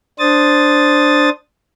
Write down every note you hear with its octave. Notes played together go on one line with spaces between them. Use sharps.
D4 C5 D#6 A6